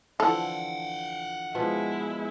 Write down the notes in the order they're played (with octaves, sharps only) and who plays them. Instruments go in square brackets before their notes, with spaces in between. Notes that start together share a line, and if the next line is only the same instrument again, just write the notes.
[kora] D3 E3 F3 [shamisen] A4 [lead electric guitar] F5 F#5
[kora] B2 F3 B4 [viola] G#3 E4